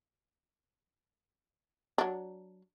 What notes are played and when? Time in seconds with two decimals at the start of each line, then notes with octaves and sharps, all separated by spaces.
1.98 F#3 D4